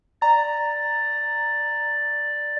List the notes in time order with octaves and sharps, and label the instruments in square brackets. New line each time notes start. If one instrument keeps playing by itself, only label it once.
[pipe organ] D5 [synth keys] A#5